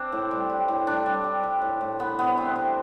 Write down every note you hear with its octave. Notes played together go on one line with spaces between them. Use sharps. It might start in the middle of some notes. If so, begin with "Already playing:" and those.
Already playing: C4 D4
A2
G3
G3
A2
G3 D4
G3
G3
G3
A2
A2
E3 B3
C3 B3
A3 C4
C3 C4